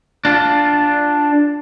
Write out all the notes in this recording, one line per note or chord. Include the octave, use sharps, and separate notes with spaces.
D4 F4